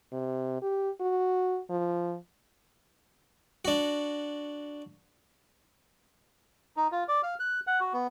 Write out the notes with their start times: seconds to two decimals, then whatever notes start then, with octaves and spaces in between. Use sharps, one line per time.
0.12 C3
0.62 G4
1.01 F#4
1.70 F3
3.65 D4 F#4
6.77 D#4
6.92 F4
7.08 D5
7.23 F5
7.40 F#6
7.67 F#5
7.80 F#4
7.93 B3